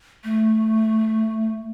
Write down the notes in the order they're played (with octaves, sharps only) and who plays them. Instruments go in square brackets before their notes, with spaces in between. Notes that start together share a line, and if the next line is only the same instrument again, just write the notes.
[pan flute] A3